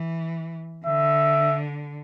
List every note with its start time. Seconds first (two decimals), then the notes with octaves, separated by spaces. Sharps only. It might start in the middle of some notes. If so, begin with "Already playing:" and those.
Already playing: E3
0.86 D3 E5